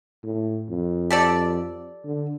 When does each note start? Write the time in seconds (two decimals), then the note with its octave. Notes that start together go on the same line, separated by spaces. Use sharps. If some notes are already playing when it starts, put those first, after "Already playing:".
0.24 A2
0.70 F2
1.10 G4 A4 D5
2.05 D3